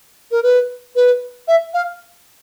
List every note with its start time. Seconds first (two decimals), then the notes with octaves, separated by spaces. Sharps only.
0.31 A#4
0.42 B4
0.95 B4
1.47 E5
1.73 F5